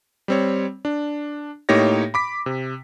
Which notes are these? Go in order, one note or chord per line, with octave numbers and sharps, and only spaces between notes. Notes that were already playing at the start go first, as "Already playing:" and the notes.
G3 C4 C#5
D4
A2 A#3 D#4 G4 C#5 A#6
B5 D6 B6
C3